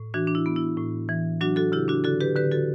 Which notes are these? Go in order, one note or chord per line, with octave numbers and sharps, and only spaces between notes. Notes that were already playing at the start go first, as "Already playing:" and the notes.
Already playing: A2
E3 D4 F#4
D4
E4
B3
E4
A2
E3
F#3 D4 F#4
F#4 A4
C#3 E4 G4
D4 F#4
D3 F#4 A4
G4 B4
D3 G4 B4
F#4 A4